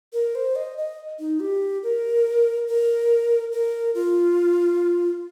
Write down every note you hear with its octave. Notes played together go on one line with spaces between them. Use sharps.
A#4
C5
D#5
D#5
D#4
G4
A#4
A#4
A#4
F4